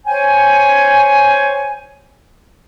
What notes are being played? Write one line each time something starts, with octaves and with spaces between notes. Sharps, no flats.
C5 C#5 G5 G#5